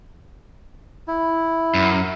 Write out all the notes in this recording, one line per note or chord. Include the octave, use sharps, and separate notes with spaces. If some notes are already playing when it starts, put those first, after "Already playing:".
E4
F#2